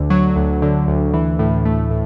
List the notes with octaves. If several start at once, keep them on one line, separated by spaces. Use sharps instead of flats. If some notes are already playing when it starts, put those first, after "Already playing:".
Already playing: D2 D3
F#3
D2
D3
D2
E3
A2
A3
A2